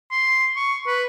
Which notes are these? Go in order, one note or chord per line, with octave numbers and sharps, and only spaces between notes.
C6
C#6
B4